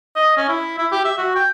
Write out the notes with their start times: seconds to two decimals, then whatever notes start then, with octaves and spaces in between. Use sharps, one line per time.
0.16 D#5
0.37 C#4
0.49 E4
0.79 E4
0.92 G4
1.05 E5
1.18 F#4
1.36 G5